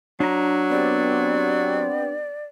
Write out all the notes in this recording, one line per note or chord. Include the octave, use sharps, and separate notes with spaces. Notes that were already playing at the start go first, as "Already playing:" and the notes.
F#3 D4 A#5
B3 C4 G4 D5